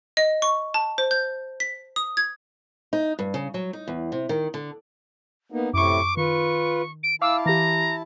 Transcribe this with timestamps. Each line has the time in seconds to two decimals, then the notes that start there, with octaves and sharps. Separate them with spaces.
0.17 D#5
0.42 C#6
0.74 A5
0.98 C5
1.11 G6
1.60 B6
1.96 D#6
2.17 G#6
2.93 D#4
3.19 G2
3.34 C#3
3.54 F#3
3.73 D#4
3.88 E2
4.12 C3
4.29 D#3
4.54 D3
5.52 A#3 B3 D#4
5.74 F#2 A2 C3 E4 C#6 D6
6.17 D#3 F4 B4 C#6
7.03 D7
7.22 E4 F5 A5 D6 E6
7.46 E3 G4 A#5